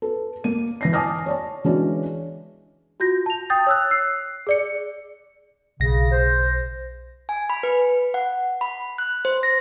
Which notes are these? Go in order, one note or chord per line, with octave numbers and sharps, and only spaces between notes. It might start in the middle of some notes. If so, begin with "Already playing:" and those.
A4 B4
A#3 D#7
E3 A#6 C7
G#5 A5 D6 D#6 F6 A#6
C#5 D5 A5
E3 G#3 C#4 D4 F#4 D5
F4 F#4 G6 A#6
A5 F7
G5 D#6 G6 A6
C#5 E6 F#6
E6 F#6 C7
G#4 D5 C#7
B1 C#3 A#6
C5
G#5
B5
B4
F#5
B5
F#6
C5
A#6